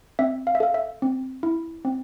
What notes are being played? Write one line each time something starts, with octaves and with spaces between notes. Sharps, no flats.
C4 E5
F5
E5
A4 F5
E5
C4
E4
C4